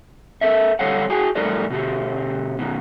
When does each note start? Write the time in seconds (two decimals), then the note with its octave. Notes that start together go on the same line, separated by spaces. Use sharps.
0.41 A4 A#4 E5
0.79 D3 G3 A4 C#5 F5 F#5
1.10 F#4 G#4 G5 G#5
1.35 A2 G3 D#4 A4 A#4 D5
1.70 B2 D3 G4
2.59 B2 D#3